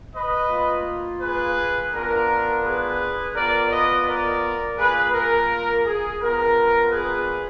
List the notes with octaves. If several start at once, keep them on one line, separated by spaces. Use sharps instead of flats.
B4 D#5
A#3 F4
G#4 B4
B3 D4 F4 A#4
G#4 B4
B3 F4 A#4 D5
B4 D#5
A#4 D5
A#3 F4 G#4 B4
A#4
G#4
B3 D4 F4 A#4
G#4 B4